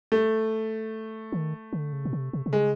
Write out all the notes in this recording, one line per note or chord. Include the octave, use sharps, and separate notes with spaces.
A3
D#3
D3
C#3
B2
C3
C3
C3
C#3 G#3